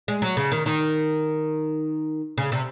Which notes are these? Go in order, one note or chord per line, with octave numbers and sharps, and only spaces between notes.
G#3
F#3
C#3
D#3
D#3
C#3
C3